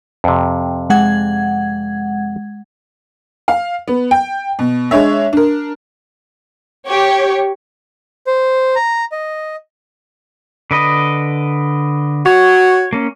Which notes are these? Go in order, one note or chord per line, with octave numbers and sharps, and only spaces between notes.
F2 C3
G#3 F#5 G#6
F5
B3
G5
B2
G#3 D4 C#5 E5
D4 A#4
G4 C#5
C5
A#5
D#5
D3 B4 D#5
F#4 C#5
A#3 C#4